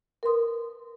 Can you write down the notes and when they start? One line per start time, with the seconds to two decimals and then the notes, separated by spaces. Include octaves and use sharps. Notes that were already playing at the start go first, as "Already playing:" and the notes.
0.23 A#4 B4 C6 D#6